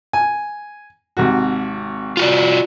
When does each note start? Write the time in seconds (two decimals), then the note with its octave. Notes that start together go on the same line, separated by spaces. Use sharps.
0.13 G#5
1.17 G#1 C3 F#4
2.17 F4 F#4 D5